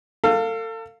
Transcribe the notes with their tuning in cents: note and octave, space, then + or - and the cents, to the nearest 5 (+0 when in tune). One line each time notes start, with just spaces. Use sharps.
A4 +35 F5 +0